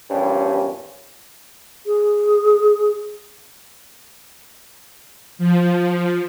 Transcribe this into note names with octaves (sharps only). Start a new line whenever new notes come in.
E2 G2 A#2 F3 G3 C#4
G#4
F3